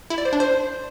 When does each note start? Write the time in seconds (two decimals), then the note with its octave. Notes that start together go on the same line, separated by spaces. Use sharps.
0.10 E4
0.18 D5
0.25 C5
0.33 D4
0.40 C5